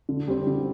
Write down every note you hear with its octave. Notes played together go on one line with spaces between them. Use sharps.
D3
G3 C4
D3